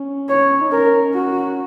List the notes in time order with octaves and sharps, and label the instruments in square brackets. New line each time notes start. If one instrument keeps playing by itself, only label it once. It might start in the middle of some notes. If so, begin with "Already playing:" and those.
Already playing: [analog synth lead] C#4
[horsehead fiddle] C#5
[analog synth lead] D#4
[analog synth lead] C#4 [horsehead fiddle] A#4
[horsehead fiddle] F#4